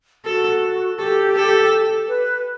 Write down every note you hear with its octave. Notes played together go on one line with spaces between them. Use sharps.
F#4 A4
G4 A4
A4
B4